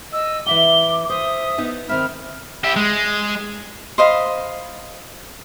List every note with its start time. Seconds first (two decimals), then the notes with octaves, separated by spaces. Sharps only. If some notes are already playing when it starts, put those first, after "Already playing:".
0.13 D#5 E6
0.46 E3 E5 F#5 D6 G7
1.10 C5 E5 D#6
1.58 B3 D#4
1.89 D#3 C4 E5 B5 F6
2.64 E4 G4
2.76 G#3
3.98 C5 D#5 F5 B5